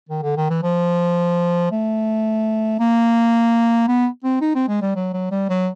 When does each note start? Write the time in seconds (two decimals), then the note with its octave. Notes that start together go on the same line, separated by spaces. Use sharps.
0.09 D#3
0.23 D3
0.37 D#3
0.50 E3
0.63 F3
1.71 A3
2.79 A#3
3.88 B3
4.24 C4
4.41 D#4
4.55 C4
4.68 G#3
4.82 G3
4.96 F#3
5.13 F#3
5.31 G3
5.49 F#3